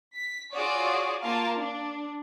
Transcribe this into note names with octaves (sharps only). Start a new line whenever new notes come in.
B6
F4 F#4 G#4 C#5 D5
A#3 F4 A#4 F5 A5
D4